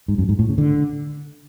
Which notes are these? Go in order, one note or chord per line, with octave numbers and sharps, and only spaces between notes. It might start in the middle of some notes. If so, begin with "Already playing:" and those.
G#2
F#2
G#2
A2
C#3
D3